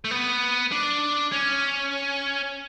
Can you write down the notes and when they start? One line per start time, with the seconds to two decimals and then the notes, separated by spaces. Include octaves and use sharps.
0.04 A3
0.11 B3
0.72 D4
1.32 C#4